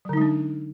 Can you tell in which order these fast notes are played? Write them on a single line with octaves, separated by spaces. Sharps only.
F#3 D3 D#4 G#3 D4